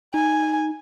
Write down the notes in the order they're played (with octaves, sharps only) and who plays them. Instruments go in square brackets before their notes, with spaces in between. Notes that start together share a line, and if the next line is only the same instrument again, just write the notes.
[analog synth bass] D#4 [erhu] G#5